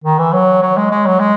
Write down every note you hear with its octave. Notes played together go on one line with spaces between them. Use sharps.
D#3
E3
F#3
F#3
G#3
G#3
F#3
G#3